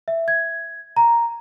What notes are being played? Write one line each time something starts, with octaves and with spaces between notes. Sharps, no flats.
E5
G#6
A#5